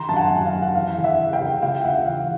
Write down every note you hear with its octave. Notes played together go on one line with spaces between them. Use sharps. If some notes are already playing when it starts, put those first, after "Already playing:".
Already playing: D#3 A#5 C6
F#2 A5
F#5 G#5
F#2
F5
D#3
F#5
E3 F5
C#3
E5 F#5
C#3
F5 G5
C#3
C#2 F5 G5
C#2 E5 F#5
E3 F5